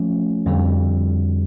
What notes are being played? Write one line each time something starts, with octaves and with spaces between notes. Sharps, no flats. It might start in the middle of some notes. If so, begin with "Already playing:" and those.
Already playing: F3 A3 C#4
F2 D3 G3